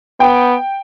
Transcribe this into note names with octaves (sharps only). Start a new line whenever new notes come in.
B3 G5